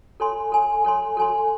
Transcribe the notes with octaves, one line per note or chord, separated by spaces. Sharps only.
A4 C#5 G#5 C6
A4 C#5 G#5 C6
A4 C#5 G#5 C6
A4 C#5 G#5 C6